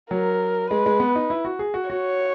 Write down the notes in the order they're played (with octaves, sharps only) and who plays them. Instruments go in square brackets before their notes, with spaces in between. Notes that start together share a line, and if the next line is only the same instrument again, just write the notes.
[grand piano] F#3 [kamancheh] A#4
[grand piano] G#3 [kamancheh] B4
[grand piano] G#3
B3
D#4
E4
F#4
G#4
F#4
[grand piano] F#4 [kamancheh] C#5